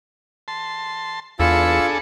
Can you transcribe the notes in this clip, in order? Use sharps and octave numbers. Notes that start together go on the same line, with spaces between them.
A5 C6
E2 D4 F4 G#4 A4 B5 E6 C#7